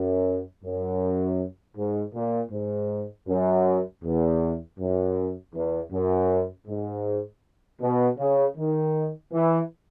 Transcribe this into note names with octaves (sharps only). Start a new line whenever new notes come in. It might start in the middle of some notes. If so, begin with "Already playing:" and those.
Already playing: F#2
F#2
G#2
A#2
G#2
F#2
E2
F#2
E2
F#2
G#2
B2
C#3
D#3
E3